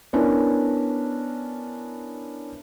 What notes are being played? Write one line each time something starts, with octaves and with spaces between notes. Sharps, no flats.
B3 C#4 D4 E4 A#4